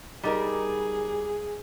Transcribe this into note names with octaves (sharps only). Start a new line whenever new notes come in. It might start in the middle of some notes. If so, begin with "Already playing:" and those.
G3 D#4 G#4 A#4